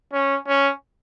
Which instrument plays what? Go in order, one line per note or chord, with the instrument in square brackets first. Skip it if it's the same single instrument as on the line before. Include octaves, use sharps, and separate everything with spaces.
[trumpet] C#4
C#4